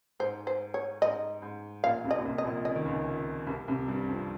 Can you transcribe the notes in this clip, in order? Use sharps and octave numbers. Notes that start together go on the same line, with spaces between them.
G#2 C5
C5
C#5
G#2 D#5
G#2
A#1 A#2 F5
C2 C3
D#5
A#2
C2 C3
D#5
A#1 A#2
C#3 D#5
D#3
C#2 C#3
C2 C3
C2 C3
G2 G3
F2 F3